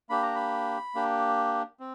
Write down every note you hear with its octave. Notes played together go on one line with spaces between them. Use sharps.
A#3 D4 G4 B5
A#5
B5
A#3 D4 G4
C4